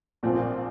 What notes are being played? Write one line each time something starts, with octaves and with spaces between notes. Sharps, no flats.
A#1 A#2 F3 C4